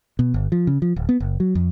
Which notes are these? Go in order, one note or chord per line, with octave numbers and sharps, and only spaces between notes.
B2
G1
F3
C#3
F3
D1
B3
F#1
F#3
F2